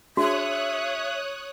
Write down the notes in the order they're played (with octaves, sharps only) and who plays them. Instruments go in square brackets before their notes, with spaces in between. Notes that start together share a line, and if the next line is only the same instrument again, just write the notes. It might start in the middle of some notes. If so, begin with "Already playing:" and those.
[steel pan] D4 G#4 C6 [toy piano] F#4 [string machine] C#5 D#6 F#6 [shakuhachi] E5